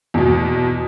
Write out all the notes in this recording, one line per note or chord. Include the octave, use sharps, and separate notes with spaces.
E2 B2